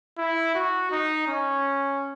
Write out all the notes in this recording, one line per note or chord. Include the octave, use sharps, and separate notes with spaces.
E4
F#4
D#4
C#4